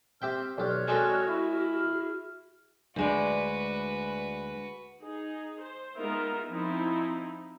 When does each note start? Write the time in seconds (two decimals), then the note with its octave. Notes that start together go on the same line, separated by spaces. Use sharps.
0.22 C4 G4 E5 G5 F6
0.58 B1 G4 C#5 D5 F6 F#6
0.88 G#3 C4 F#4 A4
1.28 E4 F6
1.72 G#4 F6
2.96 D2 G#3 F#4 B4 D5
5.03 D#4 G#4
5.61 C5
5.97 G#3 B3 D#4 F4 A#4 E5
6.49 F3 C4 D#4 E4